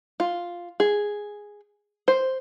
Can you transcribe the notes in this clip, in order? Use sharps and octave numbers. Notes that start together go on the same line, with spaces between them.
F4
G#4
C5